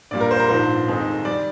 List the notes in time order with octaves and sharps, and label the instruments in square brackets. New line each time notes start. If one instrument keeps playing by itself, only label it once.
[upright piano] A#1 A#2 G3 D5
A#4
C5
A#4
A#1 G#2 F3 C5
F1 F2 D#3 G#3 D#4
D#3 G3 D5